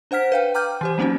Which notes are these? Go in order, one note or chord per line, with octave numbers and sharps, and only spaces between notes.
D4 C5 F#5 F6 B6
B4 F5 G5
G5 A#5 D6 F6 G6
E3 G4 C5
F#3 A#3 C4 C#4 D#4 F#4